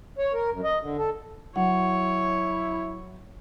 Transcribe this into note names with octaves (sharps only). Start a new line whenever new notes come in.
C#5
A#4
F#2
D#5
D3
A4
F#3 E4 C#5 F#5